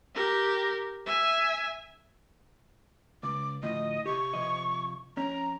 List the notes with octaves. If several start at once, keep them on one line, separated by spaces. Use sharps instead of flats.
G4 A#4
E5 G#5
C#2 D6
D2 A2 F3 D#5
C3 G4 C#6
C3 F3 D#5
F2 C#4 A#5